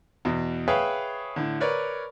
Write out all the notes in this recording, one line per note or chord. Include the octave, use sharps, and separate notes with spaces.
E2 B2
G#4 B4 C#5 E5 F5 G5
A2 D3
A#4 B4 C#5 D5